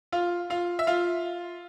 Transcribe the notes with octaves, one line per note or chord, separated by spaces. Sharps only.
F4 F5
F4 F5
E5
F4 F5